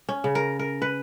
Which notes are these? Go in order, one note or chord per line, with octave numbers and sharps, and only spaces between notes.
C#4
C#3
A#4
A#4
B4